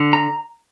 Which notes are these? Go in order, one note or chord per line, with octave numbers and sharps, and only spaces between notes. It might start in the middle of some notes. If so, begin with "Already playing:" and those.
Already playing: D3
A#5